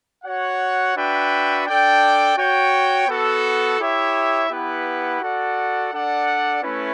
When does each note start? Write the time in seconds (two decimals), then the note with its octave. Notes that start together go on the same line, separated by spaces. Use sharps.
0.24 F#4 C#5 F#5
0.95 D4 F#4 B4 E5 G5
1.66 D4 A4 D5 G5
2.37 F#4 C#5 G5
3.08 B3 F#4 A4
3.79 E4 G4 C#5 E5
4.50 B3 E4 G4 B4 F#5
5.20 F#4 A4 D5 F#5
5.91 D4 A4 D5 F#5
6.63 A3 C#4 E4 B4